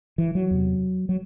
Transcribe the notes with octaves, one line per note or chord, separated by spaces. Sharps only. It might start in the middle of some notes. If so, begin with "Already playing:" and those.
E3
F#3
E2 C3
F#3